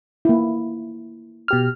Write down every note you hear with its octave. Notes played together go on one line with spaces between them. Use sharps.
A#3 E4
B2 G4 F6